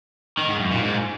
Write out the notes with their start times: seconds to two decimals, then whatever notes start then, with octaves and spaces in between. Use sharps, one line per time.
0.39 D#3
0.50 G#2
0.61 F#2
0.71 A#2
0.82 G#2